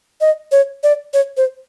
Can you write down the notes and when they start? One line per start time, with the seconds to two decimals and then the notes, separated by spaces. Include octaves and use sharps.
0.21 D#5
0.52 C#5
0.83 D5
1.14 C#5
1.37 C5